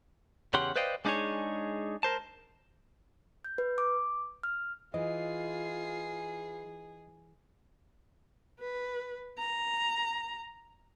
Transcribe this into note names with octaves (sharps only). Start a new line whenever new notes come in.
E2 C#3 C#4 G4 F#5 C6
B4 C5 D5 D#5 F5 G5
G#3 D4 D#4 F#4 G#4 C#5
A#4 C5 A5
G6
B4
D6
F6
E3 F4 G#4 D#5 C7
B4
A#5